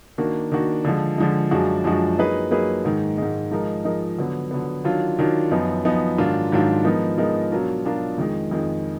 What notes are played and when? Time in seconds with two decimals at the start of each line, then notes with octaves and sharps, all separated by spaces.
0.18 D#3 A#3 D4 F#4
0.52 D#3 A#3 D4 F#4
0.84 D3 F3 G#3
1.18 D3 F3 G#3
1.51 F#2 F3 G#3 D4 F#4
1.84 F#2 F3 G#3 D4 F#4
2.17 F#3 A#3 D#4 G#4 B4
2.51 F#3 A#3 D#4 G#4 B4
2.84 G#2 D#3 G#3
3.18 G#2 D#3 G#3
3.51 F3 G#3 D#4 A#4
3.85 F3 G#3 D#4 A#4
4.18 D3 F#3 B3
4.51 D3 F#3 B3
4.84 D#3 F#3 D4 F4
5.19 D#3 F#3 D4 F4
5.51 F#2 F3 B3 D#4
5.85 F#2 F3 B3 D#4
6.18 G#2 D#3 F#3 D4 F4
6.52 G#2 D#3 F#3 D4 F4
6.85 F3 G#3 B3 D#4 A#4
7.18 F3 G#3 B3 D#4 A#4
7.52 B2 F#3 D4 F4 A#4
7.85 B2 F#3 D4 F4 A#4
8.18 F2 D#3 G#3
8.51 F2 D#3 G#3